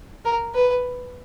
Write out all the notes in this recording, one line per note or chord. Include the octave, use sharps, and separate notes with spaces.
A#4
B4